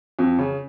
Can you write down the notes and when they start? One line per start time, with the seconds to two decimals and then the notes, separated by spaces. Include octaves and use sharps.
0.19 F2
0.39 C#3